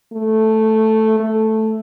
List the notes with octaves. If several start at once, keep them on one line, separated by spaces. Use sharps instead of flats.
A3
A3